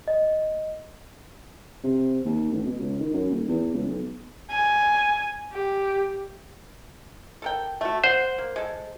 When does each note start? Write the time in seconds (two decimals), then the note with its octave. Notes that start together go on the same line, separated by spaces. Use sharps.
0.08 D#5
1.84 C3
2.25 D#2
2.52 A1
2.66 B2
2.79 C#2
3.00 D#3
3.14 F#2
3.30 D#1
3.49 E2
3.74 C#2
3.88 B1
4.50 G#5
5.53 G4
7.42 A4 A#4 G5
7.81 A3 F#4
8.04 C5 F#5
8.38 A#3
8.56 G#3 A4